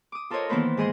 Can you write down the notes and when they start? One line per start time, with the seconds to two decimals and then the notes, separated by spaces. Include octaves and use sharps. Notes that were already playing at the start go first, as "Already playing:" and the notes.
0.12 D6 D#6
0.30 F4 A4 A#4 C5 C#5 D#5
0.49 D#3 E3 A#3 B3 B4 C5
0.77 G#2 G#4 D#5 C6